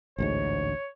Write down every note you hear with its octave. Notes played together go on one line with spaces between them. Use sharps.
A1 D2 G#2 C#5